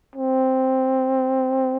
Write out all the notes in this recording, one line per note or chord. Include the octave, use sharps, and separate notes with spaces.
C4